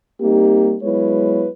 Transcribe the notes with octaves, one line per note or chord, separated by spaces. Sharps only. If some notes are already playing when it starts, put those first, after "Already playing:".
G3 A#3 C4 D#4 G4
F#3 G#3 B3 E4 B4 C#5